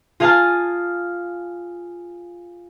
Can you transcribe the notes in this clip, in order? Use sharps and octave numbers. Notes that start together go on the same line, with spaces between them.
F4 G#4 F5 G#5 A5 F6